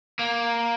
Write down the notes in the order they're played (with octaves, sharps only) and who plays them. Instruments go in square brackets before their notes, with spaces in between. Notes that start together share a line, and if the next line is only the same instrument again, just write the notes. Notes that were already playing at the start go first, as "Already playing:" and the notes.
[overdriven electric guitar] A#3